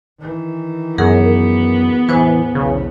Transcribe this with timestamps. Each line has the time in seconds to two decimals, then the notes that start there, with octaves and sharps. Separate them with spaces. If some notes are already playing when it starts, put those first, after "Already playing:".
0.19 D#3 E3
0.98 F#2 B3 G#4 A#4 F#5
2.09 E2 A2 E3 B4 C5 G#5
2.55 B1 E2 C#3